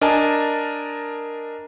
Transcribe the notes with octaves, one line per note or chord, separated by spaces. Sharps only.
D4 A#4 D#5 G#5 A5